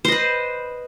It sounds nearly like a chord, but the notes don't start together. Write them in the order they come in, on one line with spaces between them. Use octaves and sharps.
C5 D#5 B4